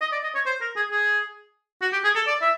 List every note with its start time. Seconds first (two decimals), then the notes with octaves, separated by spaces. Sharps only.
0.01 D#5
0.12 D5
0.23 D#5
0.35 C#5
0.46 C5
0.61 A#4
0.76 G#4
0.91 G#4
1.82 F#4
1.93 G4
2.04 G#4
2.15 A4
2.27 D5
2.41 E5